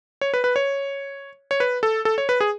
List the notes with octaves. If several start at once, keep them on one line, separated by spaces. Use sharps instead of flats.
C#5
B4
B4
C#5
C#5
B4
A4
A4
C#5
B4
G#4